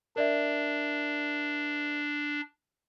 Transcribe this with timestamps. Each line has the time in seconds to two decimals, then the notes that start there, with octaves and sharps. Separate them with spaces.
0.16 D4 A#4 D5 E5